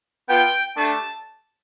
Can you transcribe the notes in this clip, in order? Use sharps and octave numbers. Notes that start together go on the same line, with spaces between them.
B3 F4 G5
A3 D4 G4 A5